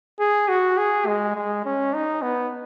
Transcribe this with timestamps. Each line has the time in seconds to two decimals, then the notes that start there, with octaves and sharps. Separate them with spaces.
0.20 G#4
0.49 F#4
0.77 G#4
1.06 G#3
1.35 G#3
1.65 C#4
1.93 D#4
2.22 B3